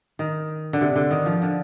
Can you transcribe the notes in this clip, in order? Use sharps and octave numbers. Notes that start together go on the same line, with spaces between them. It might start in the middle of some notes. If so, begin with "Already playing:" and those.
D#3
D3
C3
D3
D#3
F3
D3